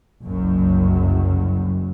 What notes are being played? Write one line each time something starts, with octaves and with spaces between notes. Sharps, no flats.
F#1 C2 F#2